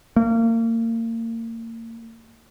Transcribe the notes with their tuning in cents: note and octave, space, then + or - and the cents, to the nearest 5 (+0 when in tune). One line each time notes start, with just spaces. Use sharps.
A#3 -35